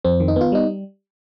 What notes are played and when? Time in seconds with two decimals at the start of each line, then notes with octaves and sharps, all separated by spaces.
0.05 F2 C4
0.20 D#3
0.28 D#4
0.36 B3 F4
0.52 G3 D#4